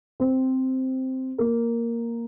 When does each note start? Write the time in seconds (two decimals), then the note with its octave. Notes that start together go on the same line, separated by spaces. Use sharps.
0.20 C4 C5
1.38 A#3 A#4